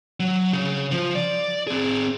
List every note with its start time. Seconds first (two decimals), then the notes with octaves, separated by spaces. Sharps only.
0.20 F#3
0.53 C#3
0.92 F3
1.15 D5
1.67 C4 G#4